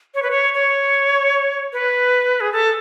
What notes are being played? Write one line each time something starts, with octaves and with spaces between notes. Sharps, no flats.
C#5
B4
C#5
C#5
B4
G#4
A4